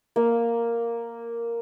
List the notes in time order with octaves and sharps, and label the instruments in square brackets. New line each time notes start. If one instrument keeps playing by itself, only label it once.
[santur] A#3 F5